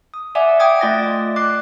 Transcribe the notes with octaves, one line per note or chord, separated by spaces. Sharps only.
D#6
D5 E5 F#5 G#5 D6
G5 D6 D#6 G#6
A3 F4 D5 D#5 A6 A#6
D5 D6 F#6 C7